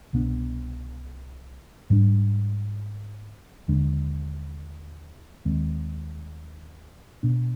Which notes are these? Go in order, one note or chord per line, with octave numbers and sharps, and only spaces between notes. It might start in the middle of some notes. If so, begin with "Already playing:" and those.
C2 B2 B3 D4
G#2 G3 D4
D#2 D3 G#3 D4
D#2 D#3 G#3 C4
B2 B3 D4